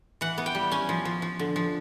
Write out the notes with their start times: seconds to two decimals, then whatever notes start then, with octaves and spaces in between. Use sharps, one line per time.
0.21 E3 F#5
0.38 B3
0.46 G5
0.55 G3
0.71 C#4 G#5
0.89 F3
1.05 F3
1.22 F3
1.39 D3
1.56 F3